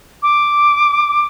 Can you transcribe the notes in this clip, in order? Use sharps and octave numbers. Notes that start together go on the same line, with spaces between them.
D6